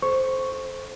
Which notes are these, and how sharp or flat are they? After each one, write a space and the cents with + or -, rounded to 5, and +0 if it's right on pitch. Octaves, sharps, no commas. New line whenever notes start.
A4 -25 C5 +0 C#6 +0